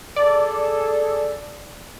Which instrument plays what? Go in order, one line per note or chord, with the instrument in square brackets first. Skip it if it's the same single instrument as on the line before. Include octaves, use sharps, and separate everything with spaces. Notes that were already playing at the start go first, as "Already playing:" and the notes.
[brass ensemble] G#4 A4 [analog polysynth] D5